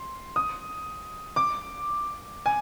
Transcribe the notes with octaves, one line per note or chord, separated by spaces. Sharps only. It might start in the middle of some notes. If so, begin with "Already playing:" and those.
Already playing: C6
D#6
D6
G#5